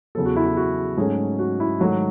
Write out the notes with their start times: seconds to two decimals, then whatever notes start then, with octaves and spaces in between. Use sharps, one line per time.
0.15 E2 C#3 F#3 B3 A4
0.25 F#4
0.36 E4
0.46 F#4
0.57 F#4
0.97 G#2 F#3 A3 C#4 G#4
1.39 F#4
1.60 E4
1.79 G#2 D#3 F#3 A3 F#4